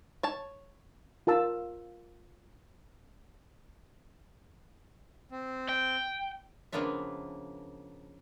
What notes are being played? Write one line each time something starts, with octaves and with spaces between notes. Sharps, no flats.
C#5 A5
F4 A#4 A5 E6
C4
G5
C#3 F3 A#3 B3 D4 E5